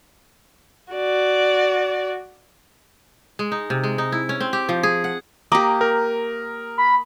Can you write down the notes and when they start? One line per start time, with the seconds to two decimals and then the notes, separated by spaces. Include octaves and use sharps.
0.94 F#4 D5
3.39 G#3
3.52 D#4
3.70 C3
3.84 G#3
3.98 D#4
4.12 E4
4.29 C#4
4.40 C4
4.53 G4
4.69 F3
4.83 G#4
5.04 F#5
5.52 A#3 G4 A#5 D6 D#6
5.81 A#4
6.78 B5